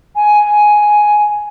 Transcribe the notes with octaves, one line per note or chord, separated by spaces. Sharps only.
G#5